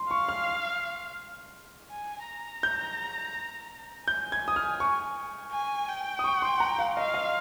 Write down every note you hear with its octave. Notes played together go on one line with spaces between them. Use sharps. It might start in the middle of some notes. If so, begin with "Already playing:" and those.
Already playing: C6
F5 C#6
F6
G#5
A#5
G6
G#5 G6
G#6
D#6
F6
C#6
G#5
G5
D#6
C#6
C6
A#5
F5
D#5 F5
D#5